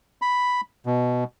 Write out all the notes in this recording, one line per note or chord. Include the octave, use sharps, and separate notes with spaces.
B5
B2